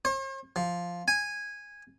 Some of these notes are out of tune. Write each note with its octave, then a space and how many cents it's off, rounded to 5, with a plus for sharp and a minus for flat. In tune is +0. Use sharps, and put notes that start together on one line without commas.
C5 +45
F3 +0
G#5 -10